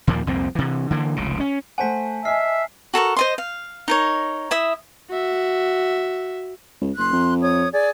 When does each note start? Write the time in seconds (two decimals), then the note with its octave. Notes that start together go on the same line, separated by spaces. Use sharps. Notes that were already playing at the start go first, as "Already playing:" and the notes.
0.07 D#2 A#2 F3 A#3
0.27 C2 F2 A#2 C4
0.55 C3 E3
0.91 D3 E3 A#3
1.16 F1 C#2 C#3
1.40 C#4
1.78 A3 C5 F#5 G#5 A5 B6
2.25 D#5 E5 G#5 F6 C7
2.94 F#4 A4 A#4 C#6
3.17 C5 D#5 C6
3.38 F5
3.88 D#4 A#4 C#5
4.51 E4 E5 D#6
5.09 F#4 E5
6.81 C#2
6.97 F#1 C6 F#6
7.13 F2
7.40 C#5 D#6
7.73 G#4 D5